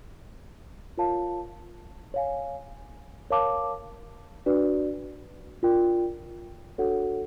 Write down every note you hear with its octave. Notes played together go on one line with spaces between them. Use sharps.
F4 A#4 C#5 F5 A5
C#5 F5 G#5
A#4 C#5 F5 A5 D6
D4 F#4 B4 D5
D4 F4 A#4 D5 G5
D4 F#4 A4 C#5 F#5